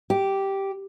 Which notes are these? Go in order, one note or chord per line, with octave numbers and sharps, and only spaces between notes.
G4